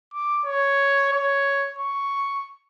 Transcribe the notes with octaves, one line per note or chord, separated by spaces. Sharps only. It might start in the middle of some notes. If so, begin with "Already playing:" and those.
D6
C#5
C#5
C#6